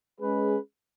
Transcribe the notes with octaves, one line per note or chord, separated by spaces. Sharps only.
G#3 C#4 G#4 B4